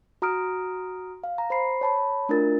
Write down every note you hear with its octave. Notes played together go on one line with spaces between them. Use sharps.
F#4 A#5 D#6 F6 D7
F5
A#5
C5 B5 C7
C#5 A5 B5
A3 D4 E4 F4 A#4 A6